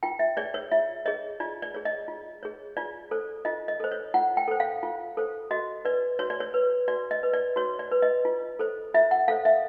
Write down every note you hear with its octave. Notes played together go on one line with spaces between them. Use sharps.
F4 G5
E5
G#4 C#5 D5
C#5
F4 E5
G#4 C#5 D#5
F4 D5
D5
G#4 C#5
D#5
F4
G#4 C#5
F4 D5
A4 C5
F4 D#5
D#5
A4 C5
C#5
F4 F#5
G5
A4 C5
F5
F4
A4 C5
F#4 D#5
B4 D5
F#4 C#5
D5
C#5
B4
F#4 D5
D#5
B4
D5
F#4 C#5
D5
B4
D#5
F4
A4 C5
F4 E5
F#5
A4 C5 F5
E5